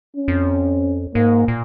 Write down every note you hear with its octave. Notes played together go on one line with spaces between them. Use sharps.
C#4
F2
G#2 A#3
A#2